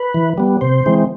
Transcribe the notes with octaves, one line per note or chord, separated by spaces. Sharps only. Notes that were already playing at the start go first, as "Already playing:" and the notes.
Already playing: B4
E3
G3 B3
C3 C5
E3 G#3 C4